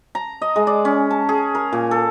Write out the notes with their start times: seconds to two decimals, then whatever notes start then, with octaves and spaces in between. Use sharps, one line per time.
0.15 A#5
0.42 D#5
0.56 G#3
0.67 D5
0.85 C#4
1.10 A5
1.29 G#4
1.55 A#4
1.73 A#2
1.91 A4